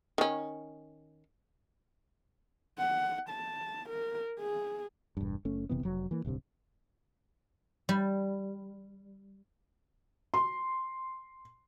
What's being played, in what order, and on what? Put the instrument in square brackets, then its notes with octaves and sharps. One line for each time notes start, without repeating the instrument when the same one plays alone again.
[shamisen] D#3 C#4
[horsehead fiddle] F#5
A5
A#4
G#4
[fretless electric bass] E1 G2
F#1 A3 C#4
F#1 C3 E3 B3
F1 F#3
E3 A#3
D1 C2 G2 C3
[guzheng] G3
[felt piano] C6